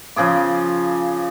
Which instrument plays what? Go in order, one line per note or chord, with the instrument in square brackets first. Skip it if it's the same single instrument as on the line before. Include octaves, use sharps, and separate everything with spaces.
[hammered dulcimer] C#3 F3 G#4 D6